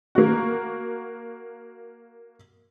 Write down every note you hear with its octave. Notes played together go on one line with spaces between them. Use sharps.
A#3 F#4